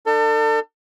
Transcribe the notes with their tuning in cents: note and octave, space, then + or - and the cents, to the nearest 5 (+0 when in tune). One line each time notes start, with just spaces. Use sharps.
D4 +40 A4 +35